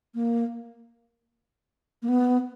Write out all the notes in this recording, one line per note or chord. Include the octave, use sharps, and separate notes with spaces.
A#3
A#3
B3